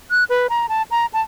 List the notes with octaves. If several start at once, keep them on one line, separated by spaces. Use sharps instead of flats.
F#6
B4
A#5
A5
A#5
A5